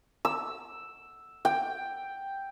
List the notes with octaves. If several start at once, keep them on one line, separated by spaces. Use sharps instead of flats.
E6
G5